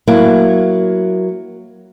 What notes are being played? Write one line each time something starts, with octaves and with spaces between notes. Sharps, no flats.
F#3 A#3 E4